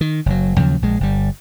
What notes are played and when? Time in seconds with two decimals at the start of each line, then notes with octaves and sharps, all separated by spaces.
0.01 D#3
0.26 F#1 F#3
0.58 D#2 C#3 F3 F#3
0.82 A#1 G#3
1.00 G1 G3